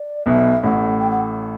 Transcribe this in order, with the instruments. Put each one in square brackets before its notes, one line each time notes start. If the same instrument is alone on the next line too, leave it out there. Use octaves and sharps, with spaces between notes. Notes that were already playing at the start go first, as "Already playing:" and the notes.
Already playing: [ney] D5
[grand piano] B1 B2 [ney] E5
[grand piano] A1 A2 [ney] F#5
[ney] G5
F#5